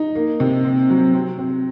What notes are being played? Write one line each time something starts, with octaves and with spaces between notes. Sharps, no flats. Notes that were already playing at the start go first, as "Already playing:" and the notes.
Already playing: D#4
A#3
C3
C4
F#3
C4
C4